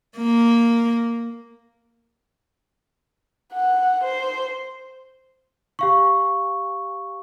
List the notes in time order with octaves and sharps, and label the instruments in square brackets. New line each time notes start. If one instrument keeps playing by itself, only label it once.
[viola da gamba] A#3
[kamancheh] F#5
C5
[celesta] G4 F5 C#6